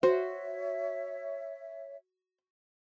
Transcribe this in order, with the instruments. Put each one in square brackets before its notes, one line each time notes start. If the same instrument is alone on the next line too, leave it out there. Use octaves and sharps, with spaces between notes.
[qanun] F#4 [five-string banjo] C5 [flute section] C#5 E5